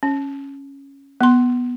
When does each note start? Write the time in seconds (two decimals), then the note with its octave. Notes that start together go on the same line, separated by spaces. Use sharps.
0.03 C#4
1.21 B3 C6